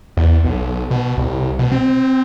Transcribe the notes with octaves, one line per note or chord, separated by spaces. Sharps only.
E2
B1
B2
C2
B2
C4